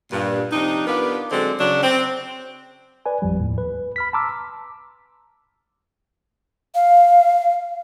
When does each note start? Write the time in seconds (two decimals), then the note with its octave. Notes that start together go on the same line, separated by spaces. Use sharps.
0.12 G2 A#2
0.52 C3 F3 D4 D#4
0.87 B3 D4 F4 G4 A#4 B4
1.31 D3 F#3 G#3 C4
1.59 C#3 F#3 D4
1.83 C4
3.06 B4 D5 G#5
3.22 G#1 F2 F3 G3
3.39 D#2 A2
3.58 B4
3.96 B5 F6 B6
4.13 A5 A#5 C6 D6 E6 F6
6.75 F5